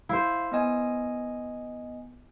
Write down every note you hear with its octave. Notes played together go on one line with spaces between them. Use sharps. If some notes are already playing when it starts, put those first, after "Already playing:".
E4 C5 F5
B3 D#5 G#5